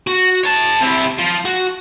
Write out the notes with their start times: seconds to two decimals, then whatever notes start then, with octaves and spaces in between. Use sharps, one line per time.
0.07 F#4
0.43 C#5 A5
0.80 C3 E4
1.18 F3
1.45 F#4